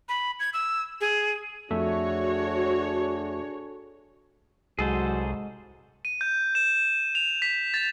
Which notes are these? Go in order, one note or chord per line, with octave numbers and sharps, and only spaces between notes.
B5
G#6
E6
G#4
F2 A3 D4 F#4 G#4 A4 C#5 E5
C2 G#2 F#3 G#4 A4 C5
D#7
G6
E7
F7
B6
A6